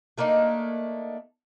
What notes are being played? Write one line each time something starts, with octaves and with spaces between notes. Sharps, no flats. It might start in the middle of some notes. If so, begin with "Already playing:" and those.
A3 A#3 D4 D#4